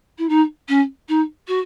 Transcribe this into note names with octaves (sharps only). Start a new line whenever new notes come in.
E4
D#4
C#4
D#4
F#4